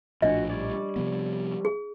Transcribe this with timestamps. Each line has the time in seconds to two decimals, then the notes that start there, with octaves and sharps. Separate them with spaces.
0.22 A#1 A2 F3 D4 F#4 D#5
0.50 G3 C#5 D5
0.96 C3 F3 B3
1.65 G#4